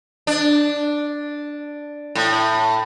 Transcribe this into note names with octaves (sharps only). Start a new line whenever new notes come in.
D4
A2